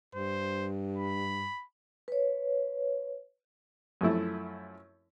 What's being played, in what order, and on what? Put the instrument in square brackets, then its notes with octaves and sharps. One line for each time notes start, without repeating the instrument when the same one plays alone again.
[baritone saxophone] G2 [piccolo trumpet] C5
[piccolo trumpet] B5
[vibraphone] B4 C#5
[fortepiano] F#2 F3 A3 E4